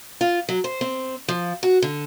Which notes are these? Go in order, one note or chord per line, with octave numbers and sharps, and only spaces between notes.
F4
F#3
C5
C4
F3
F#4
D3